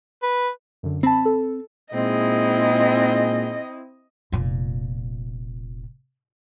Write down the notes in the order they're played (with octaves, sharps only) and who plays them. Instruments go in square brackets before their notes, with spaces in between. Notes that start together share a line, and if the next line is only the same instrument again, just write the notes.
[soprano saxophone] B4
[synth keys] F#2 D3
[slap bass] C4 [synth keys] A5 B5
[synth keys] A4
[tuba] A#2 [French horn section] G#3 D#4 [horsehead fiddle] C4 E4 [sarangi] D#5
[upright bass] F1 A#2